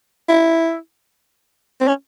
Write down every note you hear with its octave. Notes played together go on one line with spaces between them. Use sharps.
E4
C4
C#4